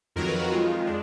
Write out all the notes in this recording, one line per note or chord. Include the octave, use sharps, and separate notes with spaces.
F2 D#3 F#3 A#4
B4
F#4
F2 D#3 G#3 F4
G#3 D4